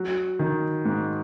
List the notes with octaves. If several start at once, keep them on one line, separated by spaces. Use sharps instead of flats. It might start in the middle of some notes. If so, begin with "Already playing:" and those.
Already playing: F#3
D#3
G#2